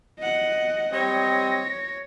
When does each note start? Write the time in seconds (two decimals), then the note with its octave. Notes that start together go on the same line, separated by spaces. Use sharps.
0.19 D#5 F#5
0.93 G3 C4 C#5 D#5 A#6